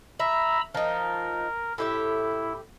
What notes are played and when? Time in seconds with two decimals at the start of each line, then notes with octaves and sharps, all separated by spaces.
0.20 E5 A#5 B5 E6
0.74 F3 D#4 A#4
1.78 A2 E4 G4 E5